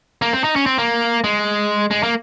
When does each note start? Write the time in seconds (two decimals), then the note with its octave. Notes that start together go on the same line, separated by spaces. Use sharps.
0.22 A#3
0.33 C4
0.44 D#4
0.56 C#4
0.66 C4
0.78 A#3
1.24 G#3
1.91 G#3
2.03 A#3